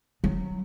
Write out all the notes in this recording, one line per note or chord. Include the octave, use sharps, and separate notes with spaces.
F#3